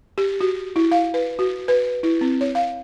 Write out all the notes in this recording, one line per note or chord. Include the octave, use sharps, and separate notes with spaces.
G4
F#4
E4
F5
B4
F#4
B4
E4
C4
C#5
F5